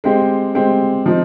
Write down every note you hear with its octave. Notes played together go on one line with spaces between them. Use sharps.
G#3 C4 G4
G#3 C4 G4
F3 C4 D#4